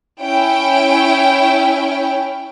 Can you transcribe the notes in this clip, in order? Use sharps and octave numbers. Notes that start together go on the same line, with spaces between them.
C#4 E4 C#5 G5